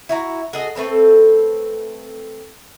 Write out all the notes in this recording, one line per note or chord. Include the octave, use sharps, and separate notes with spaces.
E4 F#4 A#5
F#4 G#4 A4 D#5
A3 C4 A4 B4